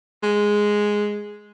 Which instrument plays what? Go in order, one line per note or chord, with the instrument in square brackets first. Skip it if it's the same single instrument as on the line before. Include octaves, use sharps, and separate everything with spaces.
[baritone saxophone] G#3